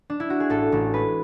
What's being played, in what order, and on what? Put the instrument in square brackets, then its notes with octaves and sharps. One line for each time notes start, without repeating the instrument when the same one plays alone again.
[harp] D4
E4
F#4
G#4
A1 A4
A1
G#3 B4